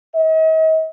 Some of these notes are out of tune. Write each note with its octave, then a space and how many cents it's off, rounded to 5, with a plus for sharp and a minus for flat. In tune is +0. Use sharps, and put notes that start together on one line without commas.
D#5 +45